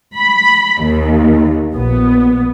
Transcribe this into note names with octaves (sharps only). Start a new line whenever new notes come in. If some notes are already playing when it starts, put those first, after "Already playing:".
B5
D#2
A#1 B3